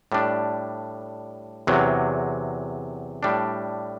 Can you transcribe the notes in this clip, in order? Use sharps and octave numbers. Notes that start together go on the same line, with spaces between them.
A2 G3 D4
E2 C3 F#3
A2 G3 D4